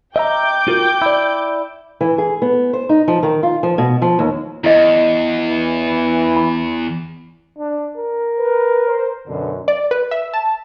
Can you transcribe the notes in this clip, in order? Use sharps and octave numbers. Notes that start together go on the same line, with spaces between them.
D#5 E5 G5 A#5 D6 G6
F4 F#4 A#4
E4 D5
E3
G#4
B3
C5
D#4
F3
D#3
F4
F3
B2
F3
D#2
E2 E4 D#5
E3
B5
D4
A#4
B4
C5
F#2 B2 D3
D5
B4
E5
A5